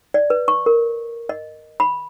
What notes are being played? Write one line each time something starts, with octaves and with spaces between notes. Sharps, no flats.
D5
B4
C#6
A#4
D#5
B5